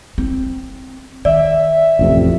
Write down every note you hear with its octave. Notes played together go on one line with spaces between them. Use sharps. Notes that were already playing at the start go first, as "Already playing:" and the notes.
C4
D#3 D5 E5
A1 F2 C3